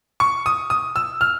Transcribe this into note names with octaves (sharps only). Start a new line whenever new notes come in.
C#6
D#6
D#6
E6
F6